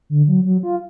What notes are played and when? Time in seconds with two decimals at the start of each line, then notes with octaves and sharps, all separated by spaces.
0.10 D3
0.28 F#3
0.45 F#3
0.63 F4